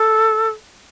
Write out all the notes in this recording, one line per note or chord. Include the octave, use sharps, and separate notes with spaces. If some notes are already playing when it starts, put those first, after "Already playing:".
Already playing: A4